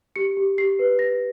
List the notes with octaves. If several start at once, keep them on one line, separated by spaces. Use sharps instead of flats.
G4 C#7
G4
G4 C7
B4
B4 A#6